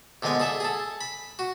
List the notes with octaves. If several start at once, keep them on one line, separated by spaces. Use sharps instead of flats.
A#1 D3 G#3 B3 G#5
G#4 A4 E5
G#4 A4
B5
F#4